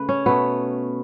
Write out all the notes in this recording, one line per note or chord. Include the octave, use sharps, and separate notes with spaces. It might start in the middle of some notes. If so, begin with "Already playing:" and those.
Already playing: C#3 A3 B4
C#4
B2 A3 B3